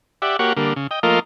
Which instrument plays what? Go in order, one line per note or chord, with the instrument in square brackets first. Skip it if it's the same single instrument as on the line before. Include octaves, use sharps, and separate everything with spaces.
[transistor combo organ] G4 D5 E5 F#5
A#3 F#4 G4 C#5 F#5
D3 G3 A#3
C#3
D#5 G5
F3 A3 A#3 F4 A#4 D#5